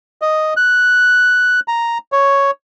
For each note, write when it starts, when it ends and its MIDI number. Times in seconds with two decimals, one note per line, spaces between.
0.22 0.54 75
0.57 1.60 90
1.68 1.98 82
2.12 2.51 73